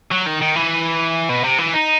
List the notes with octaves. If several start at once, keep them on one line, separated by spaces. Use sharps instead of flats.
F#3
D#3
D#3
E3
B2
C3
E3
D#4